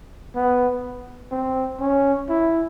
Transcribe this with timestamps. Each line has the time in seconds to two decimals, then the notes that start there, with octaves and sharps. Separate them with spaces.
0.35 B3
1.31 C4
1.80 C#4
2.29 E4